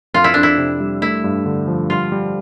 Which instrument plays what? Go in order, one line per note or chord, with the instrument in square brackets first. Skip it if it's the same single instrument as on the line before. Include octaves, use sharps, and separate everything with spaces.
[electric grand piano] F2 [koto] F4
[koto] E4
[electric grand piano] F2 [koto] D4
[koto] E4
[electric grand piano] C3
G3
[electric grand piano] A3 [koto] E4
[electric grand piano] G2
D3
F3
[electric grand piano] G3 [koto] F4
[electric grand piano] G3